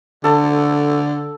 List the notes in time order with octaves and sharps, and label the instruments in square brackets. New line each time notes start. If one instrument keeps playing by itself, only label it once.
[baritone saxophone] D3 [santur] A4